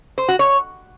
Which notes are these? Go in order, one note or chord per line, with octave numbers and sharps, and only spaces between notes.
C5
F#4
C#5